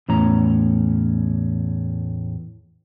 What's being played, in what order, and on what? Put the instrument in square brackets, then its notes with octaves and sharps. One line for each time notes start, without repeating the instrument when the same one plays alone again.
[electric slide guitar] E2 A2 C#4 A#5